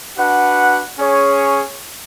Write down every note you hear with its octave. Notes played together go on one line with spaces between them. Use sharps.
D4 F#4 B4 F#5
C#4 G#4 C#5